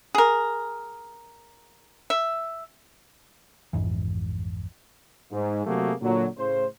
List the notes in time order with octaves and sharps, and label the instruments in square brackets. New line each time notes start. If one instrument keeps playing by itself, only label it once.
[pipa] G#4 A#4
E5
[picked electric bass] A#1 F2 G#2 E3
[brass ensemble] G#2
C3 F#3 A3 A#3 F#4 G#4
A#2 D3 F#3
A2 C#3 C5